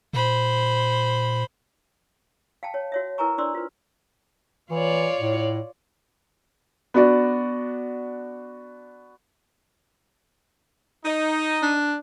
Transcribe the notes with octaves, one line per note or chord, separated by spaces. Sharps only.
A#2 C5 B5
F5 G5 A5
C#5
F#4 C#5 E5
E4 A#4 B4 G#5 A#5 C#6
D4 C5 D5 C6 E6
F4 B4
E3 F4 C#5 D5
A2
B3 D4 F#4 D5
D#4
D4